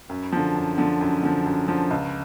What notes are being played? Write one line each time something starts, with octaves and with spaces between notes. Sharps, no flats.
F#2
D3 F3
F#2
D3 F3
F#2
D3 F3
F#2
D3 F3
C#2